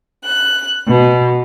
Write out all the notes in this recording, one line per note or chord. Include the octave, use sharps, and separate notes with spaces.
F#6
B2